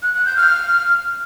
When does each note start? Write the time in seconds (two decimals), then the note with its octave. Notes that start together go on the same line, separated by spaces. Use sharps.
0.03 F#6
0.14 F#6
0.25 G6
0.37 F6